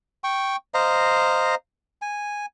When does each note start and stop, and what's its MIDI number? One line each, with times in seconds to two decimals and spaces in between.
0.24 0.56 79
0.24 0.56 85
0.74 1.55 72
0.74 1.55 75
0.74 1.55 77
0.74 1.55 82
2.02 2.46 80